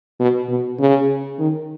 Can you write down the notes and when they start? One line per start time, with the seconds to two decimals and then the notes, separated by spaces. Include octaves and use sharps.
0.20 B2
0.49 B2
0.79 C#3
1.39 D#3